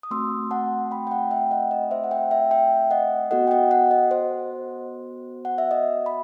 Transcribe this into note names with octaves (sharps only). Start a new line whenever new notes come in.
D#6
A3 C4 F#4 C6 E6
F#5 A5
G5 B5
G5
F#5 A5
E5 G5
D#5 F#5
D#5
C5 E5
F#5
E5 G5
E5 G5
E5 G5
D#5 F#5
B3 F#4 A4 D#5 F#5
G5
D#5 F#5
D#5 F#5
D#5
C5
F#5
E5
D#5
B5